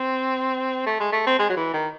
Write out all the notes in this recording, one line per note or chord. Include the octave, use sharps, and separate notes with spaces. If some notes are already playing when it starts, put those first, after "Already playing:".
Already playing: C4
A3
G#3
A3
C4
G#3
F#3
E3
D#3